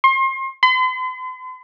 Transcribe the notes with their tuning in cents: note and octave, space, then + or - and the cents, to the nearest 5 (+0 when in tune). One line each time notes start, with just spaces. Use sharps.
C6 +35
C6 -45